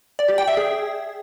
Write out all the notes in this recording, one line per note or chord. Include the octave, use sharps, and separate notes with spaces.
D5
G4
G5
E5
G#4